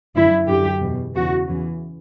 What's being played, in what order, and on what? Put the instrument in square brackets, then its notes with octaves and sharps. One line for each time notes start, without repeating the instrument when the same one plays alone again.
[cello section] F#2 D3 E4
F#2 D3 G4
E2 B2
E2 C#3 E3 F#4
E2 C#3 E3